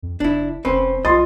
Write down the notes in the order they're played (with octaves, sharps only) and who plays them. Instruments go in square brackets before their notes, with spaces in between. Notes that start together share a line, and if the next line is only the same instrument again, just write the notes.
[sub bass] F2
[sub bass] F#1 [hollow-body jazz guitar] D4 E4
[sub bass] F1 [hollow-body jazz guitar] C4 C#4 B4 [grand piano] C5
[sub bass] B1 [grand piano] F4 C6 A6 [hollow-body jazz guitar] D#5